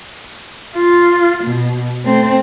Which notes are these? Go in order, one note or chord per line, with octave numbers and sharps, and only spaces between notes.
F4
B2
A3 C4